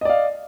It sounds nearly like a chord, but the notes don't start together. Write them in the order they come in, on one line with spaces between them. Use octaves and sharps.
D#5 D5 F5